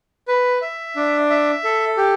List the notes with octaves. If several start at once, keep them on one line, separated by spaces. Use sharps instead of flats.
B4
E5
D4
E5
A4
G4